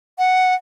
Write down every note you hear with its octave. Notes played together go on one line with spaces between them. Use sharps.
F#5